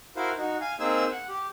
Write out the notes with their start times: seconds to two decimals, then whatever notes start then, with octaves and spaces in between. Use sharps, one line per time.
0.16 E4 F#4 A#4 C5 F5
0.38 D#4 F#4
0.61 F5 G#5
0.79 A#3 C4 D#4 G#4 C5 E6
1.11 F#5
1.28 G4